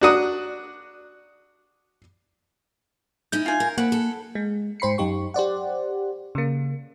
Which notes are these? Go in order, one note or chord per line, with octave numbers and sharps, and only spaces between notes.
D4 F#4 D#6
C#4 D#4 E4 G6
F4 G#5
A#4
A#3 C4 F#5 B5
A4
G#3
G#2 C5 B5 C7 C#7
F#2 D#4 G4 C#6
G4 C5 D5 F#5
C#3 A#3